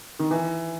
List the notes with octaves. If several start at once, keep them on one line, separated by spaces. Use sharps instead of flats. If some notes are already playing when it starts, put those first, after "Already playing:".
D#3
E3